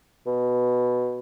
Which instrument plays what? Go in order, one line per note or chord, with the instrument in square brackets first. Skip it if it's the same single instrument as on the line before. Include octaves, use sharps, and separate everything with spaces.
[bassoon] B2